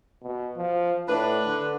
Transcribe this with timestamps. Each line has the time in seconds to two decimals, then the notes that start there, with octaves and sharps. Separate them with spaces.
0.23 B2
0.56 F3
1.09 A2 D4 B4
1.45 D3